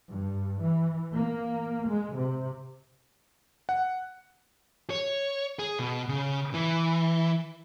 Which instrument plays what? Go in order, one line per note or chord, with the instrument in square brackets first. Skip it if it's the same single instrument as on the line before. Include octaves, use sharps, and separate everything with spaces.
[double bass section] G2
E3
A#3
G#3
C3
[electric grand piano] F#5
[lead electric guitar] C#5
G#4
B2
C#3
E3